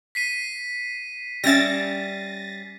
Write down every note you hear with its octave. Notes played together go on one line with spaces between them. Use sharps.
B6 C7 D#7
G3 C#4 E5 A6 A#6